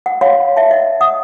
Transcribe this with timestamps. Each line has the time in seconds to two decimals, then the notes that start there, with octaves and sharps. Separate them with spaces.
0.06 F#5
0.21 C#5 F5 F#5 C6
0.56 E5 A5
0.71 D#5 F#5
1.01 F#5 D#6